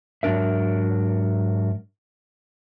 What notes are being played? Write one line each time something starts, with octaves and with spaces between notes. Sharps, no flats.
G#2 F#3 D4 A#4 E5